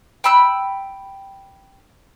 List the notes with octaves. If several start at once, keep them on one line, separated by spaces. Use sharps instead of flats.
G5 B5 E6 F#6